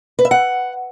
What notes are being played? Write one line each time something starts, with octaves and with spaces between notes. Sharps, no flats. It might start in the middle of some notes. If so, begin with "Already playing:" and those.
B4
E5
F#5